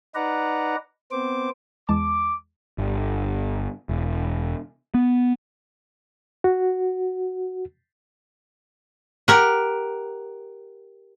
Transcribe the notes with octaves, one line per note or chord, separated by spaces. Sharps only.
D#4 B4 D5 F#5 A#5
B3 C4 C5 D6
E2 G#3 A5 D6
G1
E1
B3
F#4
G4 A#4 F#5